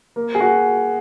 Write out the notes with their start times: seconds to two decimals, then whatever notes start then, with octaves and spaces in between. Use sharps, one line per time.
0.16 A#3
0.35 G#4
0.40 F#4